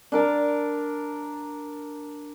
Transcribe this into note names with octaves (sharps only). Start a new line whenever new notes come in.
D4 A#4 A5